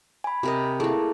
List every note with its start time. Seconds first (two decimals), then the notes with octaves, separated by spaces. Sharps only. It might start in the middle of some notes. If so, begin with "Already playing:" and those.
0.24 G#5 B5
0.43 C3 A#4 D#5
0.80 A3 A#3 E4 G#4